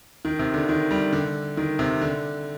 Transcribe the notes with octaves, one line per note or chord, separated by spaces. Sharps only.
D#3
C3
D3
D#3
G3
D3
D#3
C3
D3